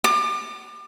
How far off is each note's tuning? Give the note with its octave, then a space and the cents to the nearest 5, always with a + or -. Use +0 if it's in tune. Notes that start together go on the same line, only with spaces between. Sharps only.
D6 +35